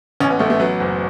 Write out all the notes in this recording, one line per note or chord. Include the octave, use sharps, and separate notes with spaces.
A1 C#4
B3
A1 A3
A3
F#3 B3
F#1